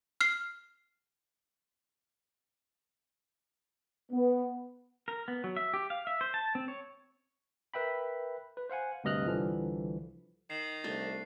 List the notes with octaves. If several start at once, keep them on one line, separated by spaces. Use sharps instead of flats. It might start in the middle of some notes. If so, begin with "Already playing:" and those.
F6 C7
B3
A#4
B3
F#3
E5
G4
F5
E5
C5
A5
C4
C#5
A#4 B4 E5 G5 B5
B4
C5 F5 F#5 G#5
D2 G2 C3 D#5 F6 F#6
C2 D3 E3 F3 G3
D#3 C7
C2 A3 D4 A6